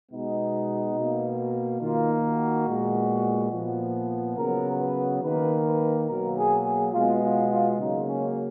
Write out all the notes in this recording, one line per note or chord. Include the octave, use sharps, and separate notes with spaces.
B2 G#3 B3 D#4
B2 A#3
D#3 A#3 F4
F#4
A#2 G#3 B3
A#2 F3 B3
C#3 F#3 B3 A#4
B4
D#3 A#3 B4
B4
B2 F#3 A#3 A#4
G#4
G#4
B2 G#3 B3 F4
F4
F4
C#3 F#3 A#3 D#4
C#4